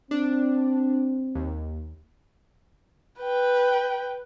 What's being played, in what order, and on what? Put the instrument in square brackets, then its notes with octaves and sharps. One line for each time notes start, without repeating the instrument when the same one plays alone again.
[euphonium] C4 [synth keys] D4
[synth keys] D#2
[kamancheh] B4 G5